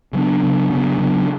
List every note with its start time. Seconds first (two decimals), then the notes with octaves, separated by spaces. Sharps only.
0.13 C#3 F#3 B3 D4
0.42 C#3 F#3 B3 D4
0.70 C#3 F#3 B3 D4
0.98 C#3 F#3 B3 D4